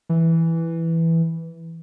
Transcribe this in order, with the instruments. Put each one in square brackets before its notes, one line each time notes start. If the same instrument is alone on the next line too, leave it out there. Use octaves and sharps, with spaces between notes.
[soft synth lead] E3